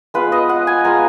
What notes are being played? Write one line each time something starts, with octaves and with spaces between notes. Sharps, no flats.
G#3 B3 F4 B4
D#5
F#5
G#5
G#3 B3 F4 A#5